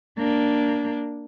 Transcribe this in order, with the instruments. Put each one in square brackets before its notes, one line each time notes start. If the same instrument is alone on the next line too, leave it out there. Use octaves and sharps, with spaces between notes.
[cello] A#3 D4